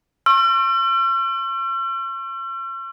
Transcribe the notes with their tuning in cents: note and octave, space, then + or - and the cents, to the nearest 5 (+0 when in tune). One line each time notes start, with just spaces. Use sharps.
C#6 -40 E6 +45